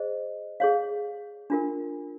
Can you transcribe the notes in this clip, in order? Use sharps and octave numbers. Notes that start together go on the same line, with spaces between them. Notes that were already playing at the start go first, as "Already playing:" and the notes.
Already playing: G#4 C5 D#5
G#4 C#5 F5
D4 F4 A#4